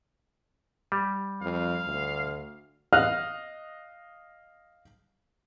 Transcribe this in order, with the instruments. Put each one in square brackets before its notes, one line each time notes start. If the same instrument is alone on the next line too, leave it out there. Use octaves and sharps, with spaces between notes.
[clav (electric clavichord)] G3
[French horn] F2 [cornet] F5
[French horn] D2
[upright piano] D#5 F5 F6 F#6